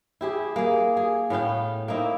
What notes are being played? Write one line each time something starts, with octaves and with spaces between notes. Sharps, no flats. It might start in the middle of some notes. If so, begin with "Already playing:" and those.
E4 G4 G#4
A#3 G#4
G#4
A2 B3 F5 G5
A#3 C4 D#4 E4